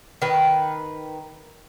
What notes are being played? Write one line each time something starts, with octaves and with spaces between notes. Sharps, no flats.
D#3 B4